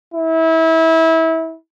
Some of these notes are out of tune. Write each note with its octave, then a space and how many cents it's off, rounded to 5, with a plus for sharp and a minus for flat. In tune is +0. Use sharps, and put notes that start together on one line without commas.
E4 -25